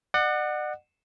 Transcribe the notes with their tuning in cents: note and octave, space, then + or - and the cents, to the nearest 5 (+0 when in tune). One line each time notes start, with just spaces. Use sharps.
D5 +45 F#5 +0